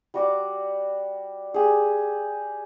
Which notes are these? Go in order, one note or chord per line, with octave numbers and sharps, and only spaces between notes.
G3 F#4 D6
G4 G#4